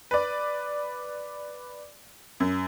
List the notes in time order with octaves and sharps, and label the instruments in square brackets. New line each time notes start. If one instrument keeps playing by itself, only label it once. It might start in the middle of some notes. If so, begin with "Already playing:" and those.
[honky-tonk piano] B4 D5
F#2